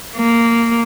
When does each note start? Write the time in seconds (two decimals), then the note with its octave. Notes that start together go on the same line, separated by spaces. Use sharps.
0.16 A#3